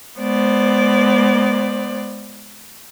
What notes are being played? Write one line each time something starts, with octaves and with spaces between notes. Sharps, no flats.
G#3 B3 C5 D5